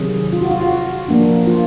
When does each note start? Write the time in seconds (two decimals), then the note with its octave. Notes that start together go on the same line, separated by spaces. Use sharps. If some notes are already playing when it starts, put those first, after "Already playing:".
Already playing: C3 D#3 F#3 G#4
0.33 F4
0.41 F#4
0.51 F4
0.61 F#4
1.08 F3 A#3 D4
1.47 F4